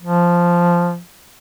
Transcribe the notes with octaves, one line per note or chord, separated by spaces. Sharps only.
F3